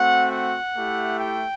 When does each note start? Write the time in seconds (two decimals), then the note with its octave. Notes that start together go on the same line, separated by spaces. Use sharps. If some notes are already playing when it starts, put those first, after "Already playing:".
Already playing: A3 C4 F#4 F#5
0.32 F#5
0.76 A3 E4 G4
1.20 G5